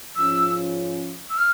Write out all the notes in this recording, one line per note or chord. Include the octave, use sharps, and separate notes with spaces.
G#2 F3 G#3 C#4 F4 E6
E6
F6